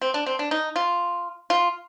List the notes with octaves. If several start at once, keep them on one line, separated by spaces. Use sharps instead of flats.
C4
D4
C4
D4
D#4
F4
F4